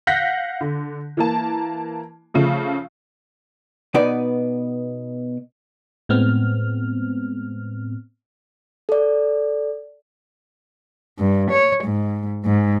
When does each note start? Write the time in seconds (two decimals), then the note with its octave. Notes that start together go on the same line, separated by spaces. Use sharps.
0.07 F5 F#5 F#6 G6 A#6 B6
0.61 D3
1.17 E3 A#3 A5
2.34 C#3 F3 A3
3.94 B2 B3 D#4 B4 D5
6.09 A2 G#3 B3 C4 F6
8.89 A4 D5
11.19 G2
11.52 C#5
11.85 G#2
12.45 G#2